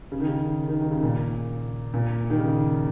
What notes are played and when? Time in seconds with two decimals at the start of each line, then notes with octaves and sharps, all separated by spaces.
0.12 C#3
0.20 D#3
0.28 C#3
0.69 D#3
0.81 D#3
0.91 C#3
1.02 A#2
1.94 A#2
2.30 D#3
2.39 C#3